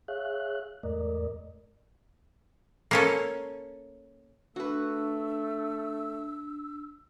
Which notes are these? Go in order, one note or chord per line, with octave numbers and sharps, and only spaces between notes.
G#4 C#5 E5 F5 F#6
E2 G#2 A3 A#4 D5 D#5
A#3 C#4 A4
A3 D4 F#4 B4 E6